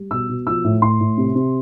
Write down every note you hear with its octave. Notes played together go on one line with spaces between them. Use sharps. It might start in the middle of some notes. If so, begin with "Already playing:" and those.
Already playing: G3
B2 E6
B2
F3 E6
A2
A2 C6
A2
C3
C3